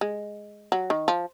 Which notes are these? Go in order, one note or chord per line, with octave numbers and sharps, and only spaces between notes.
G#3
F#3
D#3
F3